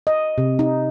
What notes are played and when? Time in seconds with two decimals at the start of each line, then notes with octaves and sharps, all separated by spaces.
0.07 D#5
0.38 C3
0.59 D#4